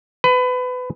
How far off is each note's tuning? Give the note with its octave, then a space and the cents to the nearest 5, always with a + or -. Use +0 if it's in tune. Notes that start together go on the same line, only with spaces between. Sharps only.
B4 +25